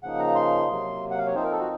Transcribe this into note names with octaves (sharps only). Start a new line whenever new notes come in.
C#3 F3 A#3 D#4 F#5
A#5
C6
C3 F#3 A#3
F#5
F5
C#5
F3 C4 D#4 C5
A#4
A4
F#4